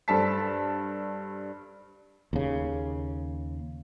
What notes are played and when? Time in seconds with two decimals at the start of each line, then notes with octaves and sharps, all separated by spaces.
0.08 G2 A4 C5 A5 B6
2.33 D#2 C#3